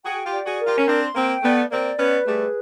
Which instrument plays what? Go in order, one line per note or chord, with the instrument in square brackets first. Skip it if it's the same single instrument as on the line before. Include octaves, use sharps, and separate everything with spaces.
[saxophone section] F#4 G#4 [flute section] G5
[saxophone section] F4 G4
[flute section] D5
[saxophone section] F#4 G#4
[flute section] A#4
[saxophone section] F4 G4
C#4
[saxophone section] C4 D4 [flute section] C6
[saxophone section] A#3 C4 [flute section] G5
[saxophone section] A3 B3 [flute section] D5
[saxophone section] A#3 C4 [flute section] D5
[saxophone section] B3 C#4 [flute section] B4
[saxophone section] G3 A3 [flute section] G#4